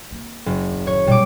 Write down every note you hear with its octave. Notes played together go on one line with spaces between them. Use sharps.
A#3 C4
F#1
E3 C4
A2 D#3 C#5
A#2 G3 D6